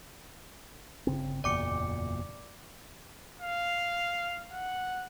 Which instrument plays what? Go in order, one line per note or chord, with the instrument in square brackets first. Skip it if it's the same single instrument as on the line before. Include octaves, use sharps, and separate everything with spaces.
[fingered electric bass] G1 C#3 C4
[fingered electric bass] F#1 E2 A#2 [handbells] D5 D6 C#7
[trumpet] F5
F#5